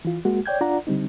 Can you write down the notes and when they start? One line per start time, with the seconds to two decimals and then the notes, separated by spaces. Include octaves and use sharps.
0.05 E3 F4
0.25 G#3 A#3 F#4
0.46 C#5 D5 G5 G6 G#6
0.61 D4 F4 D5 F#5 A#5
0.87 D3 G3 C4 D#4